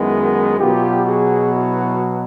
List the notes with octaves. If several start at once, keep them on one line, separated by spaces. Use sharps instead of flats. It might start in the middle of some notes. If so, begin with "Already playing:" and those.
Already playing: F#2 D#3 G#3 B3 E4 F#4
B2 F#3 B3 F4 G4
F#4 G#4
E4 F#4